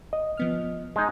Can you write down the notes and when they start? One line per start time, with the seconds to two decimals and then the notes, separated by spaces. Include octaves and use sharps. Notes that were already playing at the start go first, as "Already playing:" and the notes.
0.13 D#5
0.37 F3 B3 F6
0.96 G#3 D#4